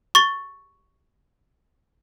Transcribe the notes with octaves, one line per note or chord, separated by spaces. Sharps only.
C#6 A6 G7